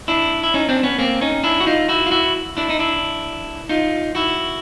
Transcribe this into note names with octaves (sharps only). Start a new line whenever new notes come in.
D4 E4
E4
C#4 D#4
C4 D4
B3 C#4
A#3 C4
C#4 D#4
D4 E4
F#4
D#4 F4
E4 F#4
F4
E4 F#4
D4 E4
D#4
D4 E4
D#4 F4
E4 F#4